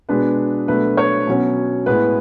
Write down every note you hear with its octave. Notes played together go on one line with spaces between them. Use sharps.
B2 G#3 D4 B4
B2 F#3 A3 D4 B4
C#5
B2 F#3 C#4
A2 G#3 B3 B4